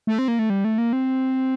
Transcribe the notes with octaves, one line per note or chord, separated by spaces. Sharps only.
A3
C4
A#3
A3
G3
A3
A#3
C4